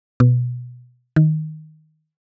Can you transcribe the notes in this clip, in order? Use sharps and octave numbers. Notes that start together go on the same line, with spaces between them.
B2
D#3